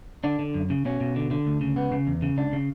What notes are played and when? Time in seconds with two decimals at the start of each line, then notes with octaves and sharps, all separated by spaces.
0.24 D3 D4
0.39 D3
0.54 F#2
0.70 C#3
0.85 B2 C#4
1.01 B2
1.16 D3
1.31 D3
1.46 D2
1.61 C#3
1.76 C#2 B3
1.92 C#3
2.07 E2
2.22 C#3
2.37 C#2 D4
2.53 C#3